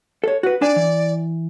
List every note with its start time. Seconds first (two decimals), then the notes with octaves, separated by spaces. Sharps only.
0.24 A4 C#5
0.43 F#4 B4
0.62 D4 D5 G#5
0.76 E3